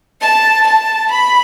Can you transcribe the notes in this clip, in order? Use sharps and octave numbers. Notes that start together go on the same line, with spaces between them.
A5
A5
B5